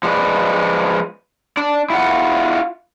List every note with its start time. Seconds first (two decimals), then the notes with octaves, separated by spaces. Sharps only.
0.03 F3 G#3 A3 B4 D5
1.57 D4 D5
1.90 E4 F4 F#5